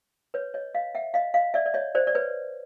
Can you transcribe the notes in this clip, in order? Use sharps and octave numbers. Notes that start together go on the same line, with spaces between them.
B4 C#5
C#5 D#5
D#5 F5
E5 F#5
D#5 F5
D#5 F5
D5 E5
D5
C#5 D#5
C5 D5
D5
B4 C#5